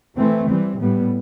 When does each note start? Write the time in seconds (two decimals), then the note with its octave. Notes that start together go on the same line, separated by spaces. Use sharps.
0.17 E3 A3 C4
0.48 E3 G3 C4
0.80 A2 G3 B3